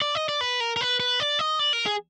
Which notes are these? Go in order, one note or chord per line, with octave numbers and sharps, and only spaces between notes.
D5
D#5
D5
B4
A#4
A#4
B4
B4
D5
D#5
D5
A#4
G#4